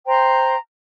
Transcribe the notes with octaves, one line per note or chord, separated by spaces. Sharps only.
C5 G5 A#5 C6